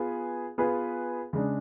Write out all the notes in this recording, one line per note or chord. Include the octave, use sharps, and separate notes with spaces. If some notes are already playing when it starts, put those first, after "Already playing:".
Already playing: B3 F4 G#4 B4
B3 F4 G#4 B4
C#3 G#3 D4